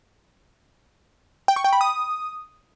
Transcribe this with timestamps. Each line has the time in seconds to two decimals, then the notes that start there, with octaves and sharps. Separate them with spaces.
1.48 G5
1.56 C#6
1.64 G5
1.73 B5
1.81 D#6